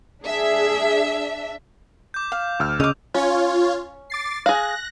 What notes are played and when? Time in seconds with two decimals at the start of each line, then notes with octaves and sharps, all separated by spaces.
0.24 D4 G#4 E5
2.14 D6 G6
2.32 F5
2.60 D2 E6 F6
2.80 C#3 D#5 D6 F7
3.14 C#4 F4 C#5
4.10 D6 A6 C7
4.46 G#4 F5 F#6 A#6